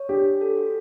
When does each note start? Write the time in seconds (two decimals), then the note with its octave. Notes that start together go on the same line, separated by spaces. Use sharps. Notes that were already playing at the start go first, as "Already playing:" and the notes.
Already playing: C#5
0.09 D4 G4
0.25 D4
0.41 A4
0.57 F#4